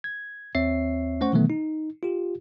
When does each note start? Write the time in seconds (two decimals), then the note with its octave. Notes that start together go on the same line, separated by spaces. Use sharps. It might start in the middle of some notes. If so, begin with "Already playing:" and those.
0.04 G#6
0.55 D#2 C4 C#5 E5 C7
1.21 A3 C#4 C5 F#5 C#6
1.33 B2 D#3 E3 F#3 A3 B3
1.50 D#4
2.03 F4 G4